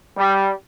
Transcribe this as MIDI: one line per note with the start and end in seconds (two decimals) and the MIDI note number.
0.18 0.50 55